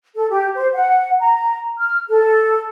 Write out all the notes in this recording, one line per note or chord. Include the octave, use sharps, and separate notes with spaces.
A4
G4
C5
F#5
A#5
F6
A4